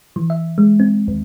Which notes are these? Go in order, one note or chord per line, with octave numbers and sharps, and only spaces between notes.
E3
E5
G#3
C4
D#2